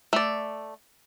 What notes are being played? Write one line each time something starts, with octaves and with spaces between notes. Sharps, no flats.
A3 D5